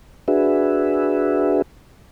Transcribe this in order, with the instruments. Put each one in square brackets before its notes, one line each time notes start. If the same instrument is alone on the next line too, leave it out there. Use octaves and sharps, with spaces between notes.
[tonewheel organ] D4 F#4 G#4 B4 E5